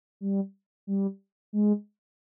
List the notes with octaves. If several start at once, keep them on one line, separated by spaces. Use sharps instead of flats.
G3
G3
G#3